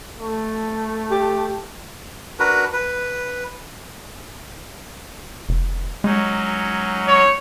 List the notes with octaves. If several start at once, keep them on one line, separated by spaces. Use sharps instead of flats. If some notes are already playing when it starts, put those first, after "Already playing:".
A3
G4
D4 F#4 A#4 B4
B4
F1
F#3 G#3 C#4 D#4
C#5